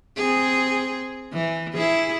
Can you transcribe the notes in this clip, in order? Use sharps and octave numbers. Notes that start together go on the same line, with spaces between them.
C4 G#4
E3
E4 G#4